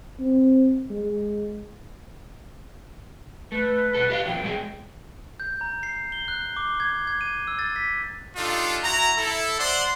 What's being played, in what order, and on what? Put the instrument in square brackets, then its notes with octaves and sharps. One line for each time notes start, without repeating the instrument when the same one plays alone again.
[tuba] C4
G#3
[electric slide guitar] A3 [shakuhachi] B4
[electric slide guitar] B2 A4
G4 D#5 F5
[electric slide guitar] A#2 F3 F#3 [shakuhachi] G5
[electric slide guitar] G#3 F#4 G#4
[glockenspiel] G6
A#5
C7
G7
F#6
D6
G#6
G#6
D#7
E6
A6
B6
[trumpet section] D4 D#4 F4 G4 A4
E4 F#4 A#5
E4 A4
C5 D5 F#5 C6